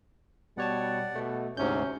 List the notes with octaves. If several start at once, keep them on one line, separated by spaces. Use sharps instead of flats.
B2 G3 C#5 D5 F#5 A5
B2 A3
D2 G#2 C3 C#4 G6